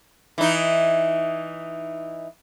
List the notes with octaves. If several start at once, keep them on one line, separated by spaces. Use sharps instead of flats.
E3 D#4